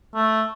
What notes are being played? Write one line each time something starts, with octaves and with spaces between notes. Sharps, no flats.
A3